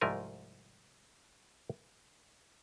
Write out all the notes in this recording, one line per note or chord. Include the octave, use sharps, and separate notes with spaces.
C2 G#2 F3 A3 A#4 G#5